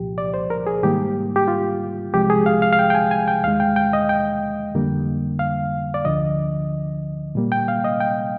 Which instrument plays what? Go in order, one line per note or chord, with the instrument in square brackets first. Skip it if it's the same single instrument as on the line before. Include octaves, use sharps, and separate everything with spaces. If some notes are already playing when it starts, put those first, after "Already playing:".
Already playing: [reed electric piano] C2 A#2 F3 G4
D5
C5
A#4
G#4
G#2 D#3 G3 A#3 G4
G4
F4
C2 C3 F3 G#3 G4
G#4
F5
F5
F5
G5
G5
G#5
G#5
G5
D#2 D#3 G#3 F5
G5
G5
D#5
G5
F2 D3 G3 A#3
F5
D5
D2 D3 F3 D#5
A#2 G3 A#3
G5
F5
D#5
G5